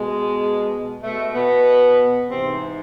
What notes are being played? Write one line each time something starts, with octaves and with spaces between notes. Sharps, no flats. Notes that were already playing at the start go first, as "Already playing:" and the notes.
Already playing: B2 G#3
B2 A3
B2 B3
G#2 C3 E3 C4